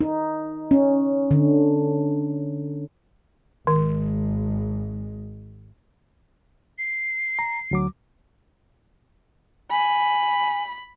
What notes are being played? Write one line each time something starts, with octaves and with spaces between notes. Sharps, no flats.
D#4
C#4
D3
G#1 D#3 G#3
C7
A#5
D2 F#3 D6
G#5 B5